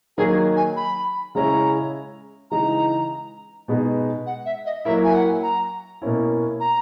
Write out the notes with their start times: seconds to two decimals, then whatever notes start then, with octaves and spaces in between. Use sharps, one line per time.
0.17 D#3 F#3 A#3 G#4
0.56 G#5
0.76 B5
1.35 C#3 G#3 C#4 E4 A#5
2.51 C#3 E3 G#3 D#4 A#5
3.68 B2 G#3 B3 D#4
4.26 F#5
4.46 E5
4.65 D#5
4.85 F#3 A#3 E4 E5
5.04 G#5
5.14 F#5
5.43 A#5
6.02 B2 A#3 C#4 E4
6.60 A#5